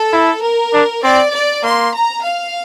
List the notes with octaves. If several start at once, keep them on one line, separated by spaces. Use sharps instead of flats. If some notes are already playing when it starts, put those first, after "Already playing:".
Already playing: A4
E4
A#4
D4
C4 D5
D5
A#3 C6
A#5
F5